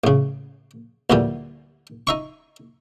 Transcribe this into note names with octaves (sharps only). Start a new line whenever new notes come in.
A1 C#3
D2 A#2 E3 G3
D#4 E5 C#6